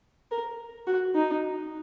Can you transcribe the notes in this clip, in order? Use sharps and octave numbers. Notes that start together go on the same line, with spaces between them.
A#4
F#4
D#4